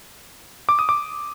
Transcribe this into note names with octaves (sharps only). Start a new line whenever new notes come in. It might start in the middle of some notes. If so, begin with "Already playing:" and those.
D6
D#6
D6